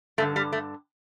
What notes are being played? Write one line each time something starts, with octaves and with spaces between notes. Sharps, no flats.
G2 D3 A3
G3
A3